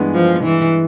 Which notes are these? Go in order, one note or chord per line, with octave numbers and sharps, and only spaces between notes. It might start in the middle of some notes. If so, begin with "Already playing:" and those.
Already playing: G2 E3 G#3 B3
F3
E3